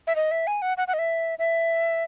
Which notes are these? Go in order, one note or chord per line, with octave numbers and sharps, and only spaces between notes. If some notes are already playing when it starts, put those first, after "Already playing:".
E5
D#5
E5
G#5
F#5
F#5
F#5
D#5
E5
E5